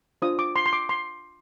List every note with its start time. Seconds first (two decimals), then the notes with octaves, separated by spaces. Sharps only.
0.22 D4 F4 C5 D#6
0.39 D6
0.56 C6
0.66 C6
0.73 D6
0.89 C6